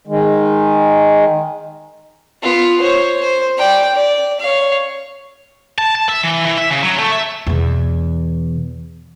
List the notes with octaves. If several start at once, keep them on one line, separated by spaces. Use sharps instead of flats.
D#3 G#3
B3 F4
C5 C#5
C5
D5 G5
D5
C#5 F5
A5
A5
E5
E3
E3
E5
C#3
F#3
A3
E5
E2 B2